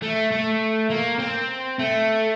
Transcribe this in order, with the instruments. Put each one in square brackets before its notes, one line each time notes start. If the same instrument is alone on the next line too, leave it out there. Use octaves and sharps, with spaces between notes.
[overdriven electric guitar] A3
A3
A#3
C4
A3